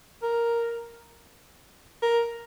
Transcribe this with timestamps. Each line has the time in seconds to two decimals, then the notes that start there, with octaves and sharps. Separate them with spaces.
0.22 A#4
2.02 A#4